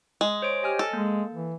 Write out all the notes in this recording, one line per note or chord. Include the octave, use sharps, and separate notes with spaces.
G#3
C5 C#5 D7
G4 D#5 G#5 F6
A4
G#3 A#3
E3